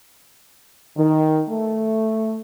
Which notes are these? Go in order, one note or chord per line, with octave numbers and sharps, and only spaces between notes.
D#3
A3